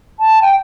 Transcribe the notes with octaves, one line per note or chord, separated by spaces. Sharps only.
A5
G5